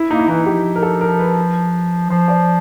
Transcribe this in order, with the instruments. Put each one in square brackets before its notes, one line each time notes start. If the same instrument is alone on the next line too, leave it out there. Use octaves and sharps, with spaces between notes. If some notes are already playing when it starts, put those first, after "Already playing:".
Already playing: [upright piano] E4
[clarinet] A#3 [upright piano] D#4
[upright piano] E4
[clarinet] E3 [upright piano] D#4
[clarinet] F3 [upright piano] G4
[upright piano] A#4
A4
A#4
B4
[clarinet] F3 [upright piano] C5
[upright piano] D5